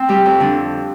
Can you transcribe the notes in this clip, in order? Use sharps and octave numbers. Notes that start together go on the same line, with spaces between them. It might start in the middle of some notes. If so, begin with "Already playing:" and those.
Already playing: C4
G3 G4
F2
D3 D4